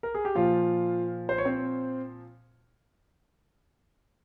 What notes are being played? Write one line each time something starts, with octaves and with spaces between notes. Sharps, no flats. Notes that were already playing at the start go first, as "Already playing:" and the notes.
A#4
G#4
G4
A#2 F3 F4
C5
C#5
C4 C5